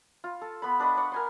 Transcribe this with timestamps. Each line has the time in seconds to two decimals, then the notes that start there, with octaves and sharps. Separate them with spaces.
0.24 F4
0.41 A4
0.62 B3 B5
0.79 D4 B4 D#5 C#6
0.97 D5 C#6
1.12 A#4 G#5 C6